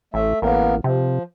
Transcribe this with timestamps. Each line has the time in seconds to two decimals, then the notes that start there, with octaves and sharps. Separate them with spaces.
0.14 A1 A3 E5
0.42 A1 A#3 B3 A#4
0.84 C3 F3